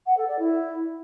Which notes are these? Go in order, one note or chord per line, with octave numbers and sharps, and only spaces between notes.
F#5
A4
D5
E4